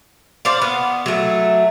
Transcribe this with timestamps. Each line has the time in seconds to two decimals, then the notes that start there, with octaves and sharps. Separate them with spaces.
0.45 C5 D5 F5
0.62 B3
1.06 F#3 A3